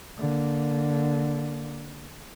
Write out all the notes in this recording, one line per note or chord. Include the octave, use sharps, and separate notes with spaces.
D3 A#3